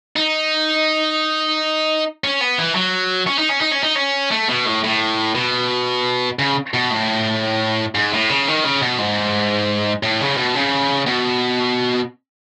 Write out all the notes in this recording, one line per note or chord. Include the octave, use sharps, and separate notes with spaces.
D#4
C#4
B3
E3
F#3
C#4
D#4
C#4
D#4
C#4
D#4
C#4
A3
B2
A2
A2
B2
C#3
B2
A2
G#2
A2
C#3
D#3
C#3
B2
G#2
A2
C#3
B2
C#3
B2